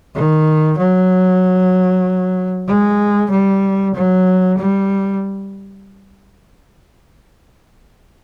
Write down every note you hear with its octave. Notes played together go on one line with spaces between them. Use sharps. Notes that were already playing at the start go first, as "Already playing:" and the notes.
D#3
F#3
G#3
G3
F#3
G3